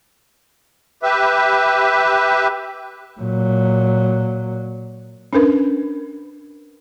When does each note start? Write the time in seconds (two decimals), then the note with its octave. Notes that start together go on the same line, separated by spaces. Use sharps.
1.03 G4 B4 E5
3.20 A#2 F#3
5.33 C#4 D4 A#4 B4